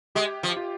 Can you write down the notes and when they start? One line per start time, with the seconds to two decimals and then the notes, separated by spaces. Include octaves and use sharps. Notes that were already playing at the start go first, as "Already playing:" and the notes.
0.15 G#3 G4
0.43 F3
0.57 F4